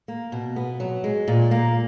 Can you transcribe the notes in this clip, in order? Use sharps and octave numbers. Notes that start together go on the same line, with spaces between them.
A#3
B2
B3
F#3
G#3
A#2
A#3